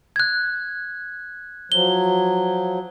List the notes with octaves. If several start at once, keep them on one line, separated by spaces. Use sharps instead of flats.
F#6 G#6
F3 F#3 G7